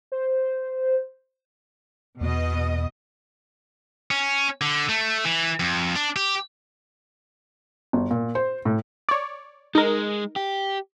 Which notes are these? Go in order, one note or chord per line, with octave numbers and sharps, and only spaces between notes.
C5
E2 B2 D#5
C#4
D3
A3
E3
F2
D4
G4
G1
A#2
C5
A2
C#5 D5
G#3 D#4 A#4
G4